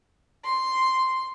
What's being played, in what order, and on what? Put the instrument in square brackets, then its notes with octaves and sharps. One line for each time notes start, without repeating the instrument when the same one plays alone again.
[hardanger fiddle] C6